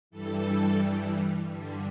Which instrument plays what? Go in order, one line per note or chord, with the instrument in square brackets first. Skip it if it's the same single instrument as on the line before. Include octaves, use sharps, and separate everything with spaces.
[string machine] G2 E3 G3 A4
G2 D3 G3